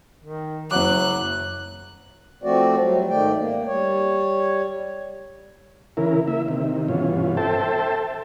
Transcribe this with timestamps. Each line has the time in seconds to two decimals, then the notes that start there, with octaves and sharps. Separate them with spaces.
0.24 D#3
0.71 F#1 F#3 F#5 D6 F#6
2.44 F3 A3 C4 F#4 D5
2.80 F#3 G3
3.10 G#2 D#3 A3 D5 G5
3.38 A#3
3.67 G3 C#5
5.97 C#3 E3 E4 A#4
6.27 A#3 E4 E5
6.48 C3 D#3
6.88 G2 B2 E3 C#4 F4
7.37 A4 C5 E5 G5 A5